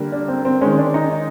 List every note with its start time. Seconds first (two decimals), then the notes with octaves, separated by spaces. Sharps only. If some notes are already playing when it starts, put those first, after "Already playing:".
Already playing: D3 G3 A#3
0.12 D4
0.28 C4
0.45 C4
0.61 D#3 G#3 C#4
0.78 D4
0.94 D#4